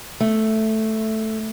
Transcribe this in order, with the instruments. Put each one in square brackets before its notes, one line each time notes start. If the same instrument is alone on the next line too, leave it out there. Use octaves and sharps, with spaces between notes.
[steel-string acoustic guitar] A3